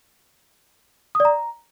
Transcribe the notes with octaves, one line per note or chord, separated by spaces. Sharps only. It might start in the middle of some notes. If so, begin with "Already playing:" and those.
D#6
D5
A#5